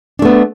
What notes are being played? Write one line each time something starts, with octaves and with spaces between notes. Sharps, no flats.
A3 B3 D4